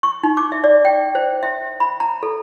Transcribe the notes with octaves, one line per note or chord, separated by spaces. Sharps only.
C#6
D#4
D6
E5
D5
G5
C5
E5
B5
A#5
A4